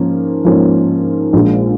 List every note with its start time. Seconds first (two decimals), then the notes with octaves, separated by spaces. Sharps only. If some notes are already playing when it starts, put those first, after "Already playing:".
Already playing: G#2 F3 A#3 C#4
0.45 G#2 F3 A#3 C#4
1.33 A#1 A#2 G#3